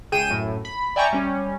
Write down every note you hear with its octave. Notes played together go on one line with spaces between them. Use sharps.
C#2 G#4 G5 D#7 E7
F#2 A2
B5
D5 E5 G5 G#5 A#5 C#6
G3 C#4